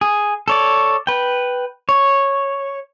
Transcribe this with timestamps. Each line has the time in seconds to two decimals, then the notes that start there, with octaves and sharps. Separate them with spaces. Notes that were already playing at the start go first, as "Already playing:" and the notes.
0.01 G#4
0.48 A4 C#5 D5
1.07 B4 G5
1.89 C#5